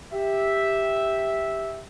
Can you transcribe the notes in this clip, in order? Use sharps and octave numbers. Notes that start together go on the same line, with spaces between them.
G4 E5